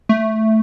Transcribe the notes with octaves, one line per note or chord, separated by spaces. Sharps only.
A3